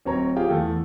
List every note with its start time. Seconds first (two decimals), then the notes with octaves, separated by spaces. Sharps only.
0.05 D1 C4 C#5 A#5
0.36 F4 G4 G#4 F5 G5
0.50 E2 E3 A3